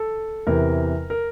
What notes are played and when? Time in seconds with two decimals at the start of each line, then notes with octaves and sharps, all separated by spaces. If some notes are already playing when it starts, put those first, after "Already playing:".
Already playing: A4
0.47 E2 C3 E3 A#4
1.10 A#4